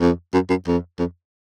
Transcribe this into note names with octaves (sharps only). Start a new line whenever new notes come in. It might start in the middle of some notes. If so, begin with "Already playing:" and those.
F2
F#2
F#2
F2
F2